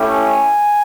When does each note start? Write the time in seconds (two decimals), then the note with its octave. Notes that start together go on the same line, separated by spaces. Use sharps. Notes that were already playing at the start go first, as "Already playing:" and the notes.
Already playing: A3 C#4 E4 G4
0.10 G#5